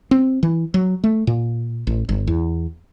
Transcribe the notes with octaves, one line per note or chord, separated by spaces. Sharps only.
C4
E3
F#3
A3
A#2
A1
G1
E2